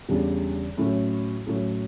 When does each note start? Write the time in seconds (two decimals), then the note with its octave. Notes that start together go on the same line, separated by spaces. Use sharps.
0.08 E2 C#3 G3 D4
0.77 A2 F#3 C#4 E4 A4
1.46 A2 F#3 C#4 E4 A4